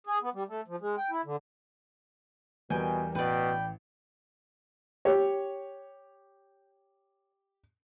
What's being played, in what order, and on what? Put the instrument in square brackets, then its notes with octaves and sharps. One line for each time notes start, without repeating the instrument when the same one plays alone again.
[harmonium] G#4
B3
G3
A3
F3
G#3
G5
E4
D3
[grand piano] E2 G3 A#4 [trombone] B2 [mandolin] G5 G#5
[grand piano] A1 [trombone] B2 [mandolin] B4 D5 [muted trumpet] G5
[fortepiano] G4 C#5